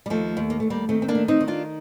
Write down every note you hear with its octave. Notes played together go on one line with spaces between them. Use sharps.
G3
D#2 F3 A3
D#2
A#3
D#2 A3
G3 A#3
D#3 A3 C4
C4
A#3 D4
D#3
C4 D#4
D#3
D4 F4